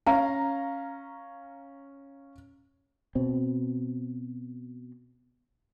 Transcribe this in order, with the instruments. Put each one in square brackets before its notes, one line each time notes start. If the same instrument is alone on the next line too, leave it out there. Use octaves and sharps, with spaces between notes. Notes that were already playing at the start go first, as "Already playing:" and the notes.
[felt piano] C#4 F5 A#5
[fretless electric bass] B2 C4